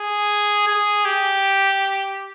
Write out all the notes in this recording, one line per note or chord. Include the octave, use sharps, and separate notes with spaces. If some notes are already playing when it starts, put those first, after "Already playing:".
Already playing: G#4
G#4
G4